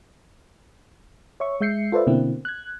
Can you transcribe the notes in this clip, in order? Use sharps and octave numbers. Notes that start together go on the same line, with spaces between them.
C#5 E5 C#6
G#3 E5 G6 C7 C#7
F4 A4 B4 C5 D5 E5
B2 D3 A#3 C4 E4
F#6 G#6